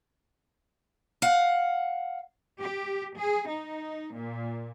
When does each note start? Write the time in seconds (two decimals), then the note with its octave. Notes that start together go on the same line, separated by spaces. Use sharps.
1.22 F5 F#5
2.59 G4
3.18 G#4
3.49 D#4
4.16 A#2